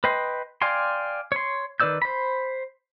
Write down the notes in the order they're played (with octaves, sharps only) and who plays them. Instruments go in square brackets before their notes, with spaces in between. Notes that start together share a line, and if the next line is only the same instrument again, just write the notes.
[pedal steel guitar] B4 D#5 G5 C6
D5 F5 G5 G#5 C6
C#5 C6
D#3 B4 D5 E6 G6
C5 B5